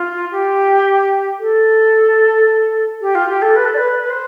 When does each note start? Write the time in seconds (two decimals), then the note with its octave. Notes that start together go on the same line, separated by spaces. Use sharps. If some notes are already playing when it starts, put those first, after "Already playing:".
Already playing: F4
0.31 G4
1.39 A4
3.01 G4
3.15 F4
3.29 G4
3.42 A4
3.56 B4
3.65 A4
3.74 D5
3.77 B4
4.01 B4
4.10 C5